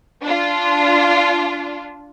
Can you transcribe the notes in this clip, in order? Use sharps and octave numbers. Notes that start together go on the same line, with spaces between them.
D4 F4